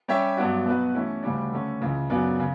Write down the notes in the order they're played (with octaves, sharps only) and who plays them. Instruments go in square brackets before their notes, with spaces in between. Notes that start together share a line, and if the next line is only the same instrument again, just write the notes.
[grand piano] G3 C#4 G4 C#5 E5
G2 F#3 B3 D4 F#4
B2 F#3 B3 F#4 B4
E3 A3 C#4 E4
D2 C#3 G3 D4
D3 A3 C#4
C#2 C#3 E3
F#2 C#3 F#3 B3 D4
C#3